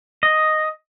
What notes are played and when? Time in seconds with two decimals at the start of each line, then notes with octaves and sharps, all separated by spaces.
0.23 D#5